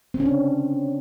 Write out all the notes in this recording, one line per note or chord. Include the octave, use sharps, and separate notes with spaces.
C4
C#4
D4